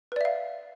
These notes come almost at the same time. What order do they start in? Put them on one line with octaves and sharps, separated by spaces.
B4 D5 E5 F5